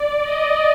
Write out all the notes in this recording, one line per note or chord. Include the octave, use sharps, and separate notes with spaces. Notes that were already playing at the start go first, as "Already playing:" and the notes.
Already playing: D5
D#5